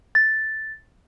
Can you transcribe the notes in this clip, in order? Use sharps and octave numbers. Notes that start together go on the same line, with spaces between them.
A6